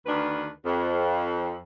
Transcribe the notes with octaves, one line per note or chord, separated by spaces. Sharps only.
D2 D#3 D4 B4
F2